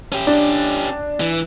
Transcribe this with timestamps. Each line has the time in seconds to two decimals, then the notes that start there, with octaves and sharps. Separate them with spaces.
0.12 C#4 G4
0.27 D4
1.21 E3